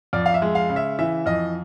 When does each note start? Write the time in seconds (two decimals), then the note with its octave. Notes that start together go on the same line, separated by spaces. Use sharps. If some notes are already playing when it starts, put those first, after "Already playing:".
0.13 F2 D5
0.26 F5
0.34 E5
0.42 G#3
0.55 F5
0.69 C#3
0.76 E5
0.99 E3 E5
1.26 F2 D#5